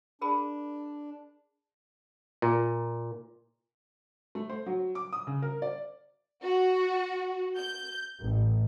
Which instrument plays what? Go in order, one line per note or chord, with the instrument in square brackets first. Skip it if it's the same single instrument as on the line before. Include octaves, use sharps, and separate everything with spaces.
[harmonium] D4 [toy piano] G#4 A#4 B5
[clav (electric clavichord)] A#2
[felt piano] A3
C5
F#3
D6
D#6
C#3
A#4
D5
[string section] F#4
G6
A1